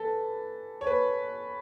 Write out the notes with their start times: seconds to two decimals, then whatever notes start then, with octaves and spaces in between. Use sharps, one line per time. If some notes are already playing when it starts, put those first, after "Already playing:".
Already playing: E3 A4 B4
0.81 C#5
0.87 B4